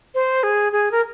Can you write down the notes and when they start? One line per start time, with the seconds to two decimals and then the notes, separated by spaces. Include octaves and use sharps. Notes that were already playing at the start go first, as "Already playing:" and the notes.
0.15 C5
0.43 G#4
0.72 G#4
0.92 A#4